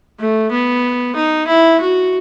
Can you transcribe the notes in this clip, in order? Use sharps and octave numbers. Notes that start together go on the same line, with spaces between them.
A3
B3
D#4
E4
F#4